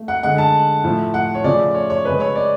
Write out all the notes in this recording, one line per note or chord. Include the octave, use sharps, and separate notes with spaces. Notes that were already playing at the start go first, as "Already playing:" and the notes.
Already playing: A3
F#5
D3 G#3 F#5
A5
A2 F3 A3
F#5
C#5
C#3 F3 A3 D5
C#5
C#5
C#3 G#3 B4
C#5
D5